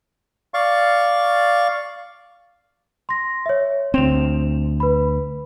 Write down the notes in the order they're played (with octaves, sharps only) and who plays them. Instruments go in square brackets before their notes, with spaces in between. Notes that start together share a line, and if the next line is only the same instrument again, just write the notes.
[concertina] D5 F5 C#6
[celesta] C6 A#6
C#5 E5
[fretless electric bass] D2 C4 [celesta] E7 F7
[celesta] B4 B5